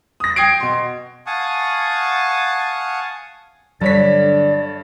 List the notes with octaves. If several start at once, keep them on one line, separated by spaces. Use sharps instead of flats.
D#6 A#6
G5 D#6 G#6 C7 D7
B2 C6
F5 F#5 G#5 A5 C#6 D#6
G2 D3 F#3 C#5 D5 B6